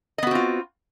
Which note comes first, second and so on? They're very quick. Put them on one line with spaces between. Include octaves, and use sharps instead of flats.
D#5 B3 F#4 C4 F4